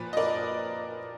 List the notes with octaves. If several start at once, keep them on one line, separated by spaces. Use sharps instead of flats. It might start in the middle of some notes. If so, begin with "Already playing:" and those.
Already playing: A#2 F3 B4
D#5
A#4 D5